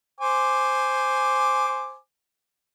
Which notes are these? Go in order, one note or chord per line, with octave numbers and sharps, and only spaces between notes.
C5 G#5 D6